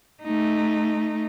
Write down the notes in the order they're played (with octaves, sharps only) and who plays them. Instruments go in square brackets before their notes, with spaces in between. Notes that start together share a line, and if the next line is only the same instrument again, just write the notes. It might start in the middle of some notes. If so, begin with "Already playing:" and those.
[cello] A3 D#4